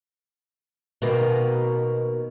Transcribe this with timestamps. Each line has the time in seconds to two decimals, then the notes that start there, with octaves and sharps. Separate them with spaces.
1.02 B2 D#3 A#3